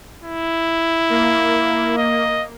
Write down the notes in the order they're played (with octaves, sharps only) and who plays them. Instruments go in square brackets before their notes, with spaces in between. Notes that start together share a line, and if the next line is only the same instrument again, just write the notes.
[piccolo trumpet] E4
[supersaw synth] A#3
[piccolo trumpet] D#5